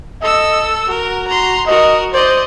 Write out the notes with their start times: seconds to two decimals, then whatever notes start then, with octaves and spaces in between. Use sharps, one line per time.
0.22 A4 D#5 E6
0.89 F#4 A#4
1.28 A#5 C6
1.67 F#4 A#4 D#5
2.13 C5 D5 D#5